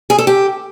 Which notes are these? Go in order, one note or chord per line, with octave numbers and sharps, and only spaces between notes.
G#4
A4
G4